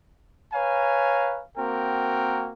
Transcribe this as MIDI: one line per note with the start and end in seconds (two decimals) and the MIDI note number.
0.53 1.42 71
0.53 1.42 73
0.53 1.42 77
0.53 1.42 80
0.53 1.42 82
1.58 2.52 58
1.58 2.52 60
1.58 2.52 66
1.58 2.52 70
1.58 2.52 79